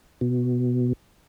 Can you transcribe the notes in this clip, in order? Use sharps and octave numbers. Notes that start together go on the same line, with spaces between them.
B2